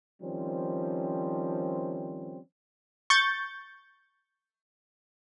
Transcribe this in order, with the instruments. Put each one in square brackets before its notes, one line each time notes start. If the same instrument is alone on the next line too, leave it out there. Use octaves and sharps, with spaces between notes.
[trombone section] D#3 F3 G3 C4 C#4
[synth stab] C#6 G6 A6